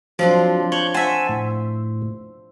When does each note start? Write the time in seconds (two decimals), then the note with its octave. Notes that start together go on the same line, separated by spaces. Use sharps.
0.19 F3 F#3 C4 D4
0.72 C#5 C#6 F#6 G6
0.94 C5 E5 F#5 G#5 A5
1.29 A2